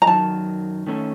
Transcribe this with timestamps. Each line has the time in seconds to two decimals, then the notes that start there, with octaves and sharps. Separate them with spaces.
0.02 A#5
0.06 F#2 D#3 F#3 A5
0.87 D#3 A3 C#4 A4